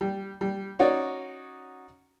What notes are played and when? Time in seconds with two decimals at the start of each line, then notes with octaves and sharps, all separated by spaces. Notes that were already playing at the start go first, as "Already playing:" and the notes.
0.01 G3
0.41 G3
0.79 C#4 D#4 F#4 C#5 D5